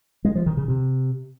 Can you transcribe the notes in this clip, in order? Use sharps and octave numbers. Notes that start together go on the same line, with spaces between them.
G#3
F3
D#3
C#3
C3